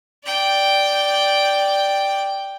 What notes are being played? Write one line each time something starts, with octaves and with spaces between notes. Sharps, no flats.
D5 G5